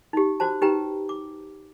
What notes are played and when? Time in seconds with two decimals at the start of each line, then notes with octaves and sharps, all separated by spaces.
0.13 D#4 G4
0.40 F#4 C5 A5
0.61 D#4 G4 B4 G5 A#5
1.09 D6